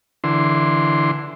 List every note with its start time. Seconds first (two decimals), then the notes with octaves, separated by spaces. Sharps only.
0.24 D3 E3 C6